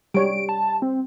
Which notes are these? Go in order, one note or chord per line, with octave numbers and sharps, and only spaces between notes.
G3 C#5 D7
A5
C4